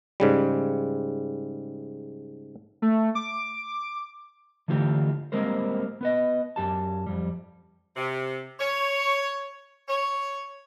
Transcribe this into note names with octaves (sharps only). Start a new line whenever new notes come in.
G#2 C#3 G3
A3
D6
D3 E3 A3 F4 G4
G3 G#3 A#3 C4 A#4 C5
B3 B4 D#5
F#2 G4 A5
F2 G3
C3
C#5
C#5